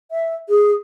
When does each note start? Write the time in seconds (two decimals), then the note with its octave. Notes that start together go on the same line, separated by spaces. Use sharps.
0.11 E5
0.49 G#4